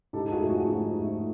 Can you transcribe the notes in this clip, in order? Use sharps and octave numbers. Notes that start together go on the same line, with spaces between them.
G#2 G4 A4
F#4 G#4
F3 A3
F#4 G#4
G#2
F3 A3